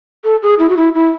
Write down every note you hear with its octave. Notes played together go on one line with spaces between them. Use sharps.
A4
G#4
E4
F#4
E4
E4